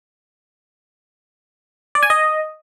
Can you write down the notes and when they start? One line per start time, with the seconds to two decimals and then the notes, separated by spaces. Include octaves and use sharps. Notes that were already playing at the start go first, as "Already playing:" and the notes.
1.95 D5
2.03 G#5
2.10 D#5